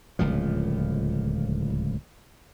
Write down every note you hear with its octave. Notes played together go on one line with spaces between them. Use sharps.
D1 C#2 A#2 F3